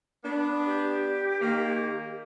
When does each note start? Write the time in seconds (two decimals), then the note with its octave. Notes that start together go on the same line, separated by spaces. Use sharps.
0.23 B3 D4
0.66 G4
1.41 D#3 A#3